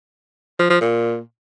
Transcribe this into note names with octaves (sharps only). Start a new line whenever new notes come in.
F3
F3
A#2